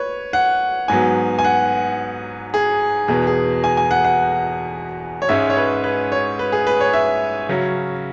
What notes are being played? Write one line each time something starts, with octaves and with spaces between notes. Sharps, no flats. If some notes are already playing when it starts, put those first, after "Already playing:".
Already playing: B4 C#5
F#5
G#2 F#3 B3 G#5
G#5
F#5
G#4
E2 B2 B3 G#4
G#4
G#5
G#5
F#5
F#5
C#5
G#2 G#3 C#4 E5
C#5
B4
B4
C#5
B4
G#4
B4
C#5
E5
C#3 F#3 C#4